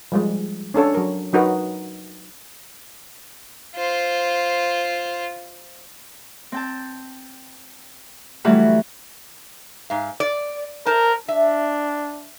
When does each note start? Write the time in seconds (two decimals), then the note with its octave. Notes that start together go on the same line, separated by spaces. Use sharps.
0.12 F3 G3 G#3
0.74 C#4 D4 A4 C#5
0.94 F#3 A#4
1.33 F#3 D#4 F#4 A#4 B4
3.75 F4 C5
6.52 C4 G5 A5
8.44 E3 F#3 G3 A3 F#4 B4
9.90 G#2 F5
10.20 D5
10.86 A#4 C5 A5
11.28 D4 E5